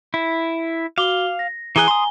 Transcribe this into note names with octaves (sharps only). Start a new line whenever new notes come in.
E4
F#4 F5 D6 G7
A#6
E3 G#4 G#5 A#5 F#6 G7
C6 D#6